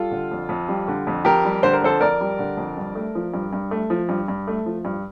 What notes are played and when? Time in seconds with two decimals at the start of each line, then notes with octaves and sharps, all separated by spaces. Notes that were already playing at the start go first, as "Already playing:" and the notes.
Already playing: G3 F4 A4
0.11 D3
0.31 F2
0.49 F2
0.68 G3
0.88 D3
1.07 F2
1.25 F2 G4 A#4
1.45 G3
1.63 D3 C5
1.73 A#4
1.82 F2 A4 C5
2.01 F2 A#4 D5
2.21 G3
2.39 D3
2.57 F2
2.77 G2
2.95 A3
3.15 F3
3.34 G2
3.53 G2
3.71 A3
3.90 F3
4.09 G2
4.28 G2
4.48 A3
4.66 F3
4.85 G2